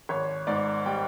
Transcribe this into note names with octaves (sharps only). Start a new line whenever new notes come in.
G#1 C#5
G#2 D5
G3 G5